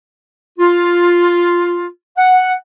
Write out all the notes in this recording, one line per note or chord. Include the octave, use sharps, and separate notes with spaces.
F4
F#5